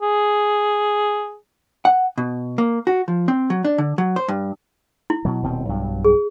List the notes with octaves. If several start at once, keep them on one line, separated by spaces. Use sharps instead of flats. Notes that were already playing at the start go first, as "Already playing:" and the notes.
G#4
F#5
B2
A#3
F#4
F3
C4
F#3
D4
D3
F#3
C5
G2
E4
B2 F#3
D#1 B2 C4
B1 G2 F#3
G#4